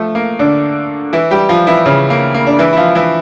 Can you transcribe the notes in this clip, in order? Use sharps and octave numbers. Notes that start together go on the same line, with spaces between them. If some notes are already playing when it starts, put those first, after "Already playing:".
Already playing: F3 A3
A#3
D3 D4
E3 E4
G3 G4
F3 F4
E3 E4
C#3 C#4
A#3
A#3
D4
E3 E4
E4
F3 F4
E3 E4